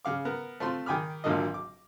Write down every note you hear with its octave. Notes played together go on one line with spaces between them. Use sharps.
C#3 F5 D6
B3 A#4
A3 C4 F4 C6
D#3 G5 G#5 B5 D6 F6
G#1 A#2 D3 F#3 A#3 D#5
D6